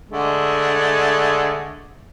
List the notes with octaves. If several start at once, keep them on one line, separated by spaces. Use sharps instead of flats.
D3 G#3 A3